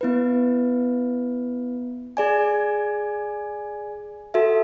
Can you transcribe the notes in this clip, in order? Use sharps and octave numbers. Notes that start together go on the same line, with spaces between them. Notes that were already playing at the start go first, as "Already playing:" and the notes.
B3 E4 B4
G#4 D5 G#5
F#4 A4 E5